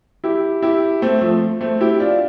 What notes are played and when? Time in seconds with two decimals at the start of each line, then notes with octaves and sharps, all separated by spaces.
0.24 E4 G4
0.62 E4 G4
1.02 A3 C4
1.22 F3 A3
1.61 A3 C4
1.81 E4 G4
2.00 D4 F4